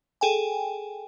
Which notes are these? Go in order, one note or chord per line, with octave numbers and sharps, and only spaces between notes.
G#4 A4 G5 G#5